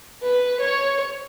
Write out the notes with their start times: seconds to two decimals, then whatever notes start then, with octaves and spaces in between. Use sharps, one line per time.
0.22 B4
0.60 C#5